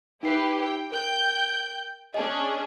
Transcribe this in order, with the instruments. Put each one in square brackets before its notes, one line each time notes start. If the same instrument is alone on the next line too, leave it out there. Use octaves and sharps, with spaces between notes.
[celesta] D#4 C7 [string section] E4 G4 B4
[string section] G5
[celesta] A#4 [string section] G5 G6
[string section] C#4 D4 G#4 [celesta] D#5